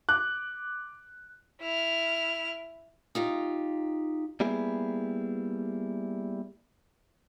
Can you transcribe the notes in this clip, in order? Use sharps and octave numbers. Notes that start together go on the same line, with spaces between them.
D6 F#6
E4 F6
D#4 F4 G4
G3 A#3 B3 E4 G#4